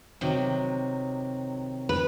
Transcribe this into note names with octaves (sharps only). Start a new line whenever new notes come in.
C3 D#3 F#3
B4